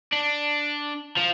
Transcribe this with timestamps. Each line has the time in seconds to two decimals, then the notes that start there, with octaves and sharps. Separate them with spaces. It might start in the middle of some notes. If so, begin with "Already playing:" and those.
0.12 D4
1.17 F3